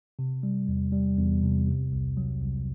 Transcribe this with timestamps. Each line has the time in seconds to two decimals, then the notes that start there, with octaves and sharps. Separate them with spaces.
0.19 C3
0.43 G3
0.68 E2
0.93 G3
1.18 E2
1.42 C3
1.67 C3
1.92 C2
2.17 F#3
2.42 C2